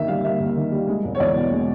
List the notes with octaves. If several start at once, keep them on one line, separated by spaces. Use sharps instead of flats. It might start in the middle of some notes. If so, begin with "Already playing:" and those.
Already playing: D#2 D#3 A#3 E5
G3 F5
A#3 E5
D#2
D#3
G3
G#3
E1
C#5
E2 D5
B2
G#3